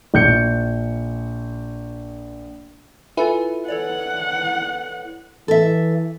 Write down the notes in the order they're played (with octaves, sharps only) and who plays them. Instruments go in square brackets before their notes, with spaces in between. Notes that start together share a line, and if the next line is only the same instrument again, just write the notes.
[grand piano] A#1 G6 C#7
[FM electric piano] E4 B4 [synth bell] F4 A4 G#5
[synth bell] A4 C#5 D5 [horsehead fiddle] F#5
[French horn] E3 [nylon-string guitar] A4 E5